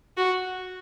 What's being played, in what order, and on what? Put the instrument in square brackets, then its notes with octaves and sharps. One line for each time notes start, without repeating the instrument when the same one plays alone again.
[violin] F#4